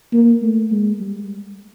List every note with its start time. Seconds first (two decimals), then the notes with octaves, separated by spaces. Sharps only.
0.13 A#3
0.42 A3
0.72 G#3
1.01 G3